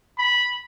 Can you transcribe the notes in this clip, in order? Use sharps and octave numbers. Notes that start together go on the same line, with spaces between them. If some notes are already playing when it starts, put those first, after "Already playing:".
B5